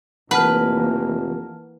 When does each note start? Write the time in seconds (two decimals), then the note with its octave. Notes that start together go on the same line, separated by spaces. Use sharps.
0.31 F1 E3 A#3 B4 F#5 A5 F6